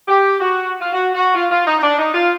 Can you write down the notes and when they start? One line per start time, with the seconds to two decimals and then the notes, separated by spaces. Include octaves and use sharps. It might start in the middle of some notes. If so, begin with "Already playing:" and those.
0.09 G4
0.40 F#4
0.81 F4
0.93 F#4
1.14 F#4
1.35 F4
1.51 F4
1.67 D#4
1.79 D#4
1.82 D4
1.98 D#4
2.14 F4